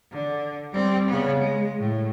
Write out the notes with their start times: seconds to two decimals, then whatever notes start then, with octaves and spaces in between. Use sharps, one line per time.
0.12 D3
0.72 G3 C4
1.08 C#3 B3
1.38 G#3
1.78 A2